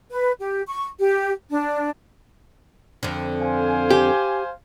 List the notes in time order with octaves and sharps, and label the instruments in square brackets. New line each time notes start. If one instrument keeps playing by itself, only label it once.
[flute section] B4
G4
C#6
G4
D4
[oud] F2 D3
[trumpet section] C5 F5 G#5
[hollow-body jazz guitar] G4